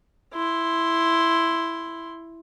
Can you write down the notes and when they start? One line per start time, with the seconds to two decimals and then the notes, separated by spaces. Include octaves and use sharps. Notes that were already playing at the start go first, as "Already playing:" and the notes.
0.34 E4 C6